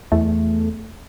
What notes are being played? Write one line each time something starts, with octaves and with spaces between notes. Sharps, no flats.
E2 A3